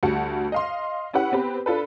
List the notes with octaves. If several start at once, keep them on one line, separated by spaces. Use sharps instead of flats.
D2 G3 F#4 A5 C#7
D#5 F5 C6
C#4 E4 G4 B4 F#5
B3 C4 G4 B4
D4 F4 A4 B4